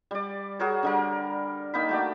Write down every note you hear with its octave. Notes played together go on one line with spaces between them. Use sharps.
G3 D5
F#4 G#4 A#4 C#5
D3 G3 A#4
D#3 A#3 D#4 B5
A3 F#4 D5